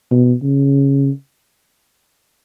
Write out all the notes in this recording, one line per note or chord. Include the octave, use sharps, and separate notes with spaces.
B2
C#3